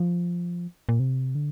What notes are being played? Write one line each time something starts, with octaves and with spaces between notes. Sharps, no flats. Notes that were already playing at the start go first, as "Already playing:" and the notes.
Already playing: F3
A#2
C3
D3